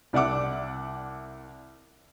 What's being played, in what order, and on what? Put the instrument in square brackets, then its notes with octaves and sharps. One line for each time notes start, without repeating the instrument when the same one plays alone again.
[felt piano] C2 D5 E5 F#5 D6